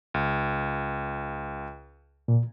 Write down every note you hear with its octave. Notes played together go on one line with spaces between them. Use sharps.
C#2
A#2